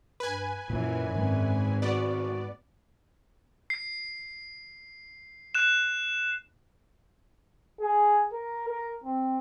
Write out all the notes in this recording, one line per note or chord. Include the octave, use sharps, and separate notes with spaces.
G2 B4 G#5
F#2 A#2 E3 F#3
G#2 D#3 C4
B3 F#4 D5
C7
F#6 E7
G#4
A#4
A#4
C4